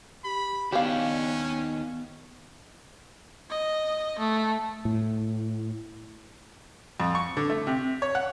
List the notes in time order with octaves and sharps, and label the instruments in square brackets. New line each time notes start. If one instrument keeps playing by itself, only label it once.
[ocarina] G4 [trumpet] B5
[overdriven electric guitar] D#2 D4 [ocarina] B3 [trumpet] C#4 [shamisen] G4 F5
[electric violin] D#5
A3
[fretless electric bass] A2
[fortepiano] F2
C#6
D3
A3
C3
C#5
F#5